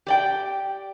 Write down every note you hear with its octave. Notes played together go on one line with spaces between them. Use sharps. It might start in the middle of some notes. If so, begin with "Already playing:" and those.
G4 D5 G5